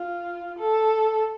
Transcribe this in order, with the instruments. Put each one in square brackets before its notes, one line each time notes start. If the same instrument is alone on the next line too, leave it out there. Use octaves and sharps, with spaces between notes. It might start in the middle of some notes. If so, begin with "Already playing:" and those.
Already playing: [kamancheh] F4
A4